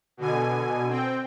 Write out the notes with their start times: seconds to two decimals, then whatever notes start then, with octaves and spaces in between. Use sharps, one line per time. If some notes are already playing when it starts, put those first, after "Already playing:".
0.17 B2 D3 G#5
0.88 C4 G5